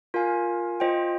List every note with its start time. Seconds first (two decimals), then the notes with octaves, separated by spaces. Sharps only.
0.14 F4 A#4 F5 G#5
0.80 F4 C5 D#5 G5